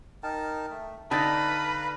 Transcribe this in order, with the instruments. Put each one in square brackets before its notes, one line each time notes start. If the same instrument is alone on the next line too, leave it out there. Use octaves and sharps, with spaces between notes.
[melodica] D#4 A#4 A5 [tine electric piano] G5
[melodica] A3
[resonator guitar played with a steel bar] D3 D#4 G5 [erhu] B4 [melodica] F5 A#5 [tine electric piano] A5 A6